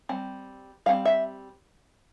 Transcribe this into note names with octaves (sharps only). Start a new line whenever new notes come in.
G3 C4
G3 C4 F5
E5